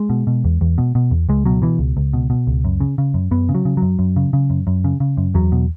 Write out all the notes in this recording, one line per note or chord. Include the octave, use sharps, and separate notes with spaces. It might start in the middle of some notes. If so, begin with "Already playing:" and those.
Already playing: G#3
B2
B2
E2
E2
B2
B2
E2
C#2 G#3
B2 F#3
B2 E3
C#2
C#2
B2
B2
C#2
F#2
C#3
C#3
F#2
F#2 B3
C#3
F#3
C#3
F#2 F#3
F#2
C#3
C#3
F#2
F#2
C#3
C#3
F#2
E2 F#3
B2